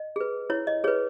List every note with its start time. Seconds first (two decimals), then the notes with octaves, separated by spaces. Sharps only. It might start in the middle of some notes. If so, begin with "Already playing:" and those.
Already playing: D#5
0.16 G#4 B4
0.50 E4 C#5
0.67 D#5
0.84 G#4 B4 C#5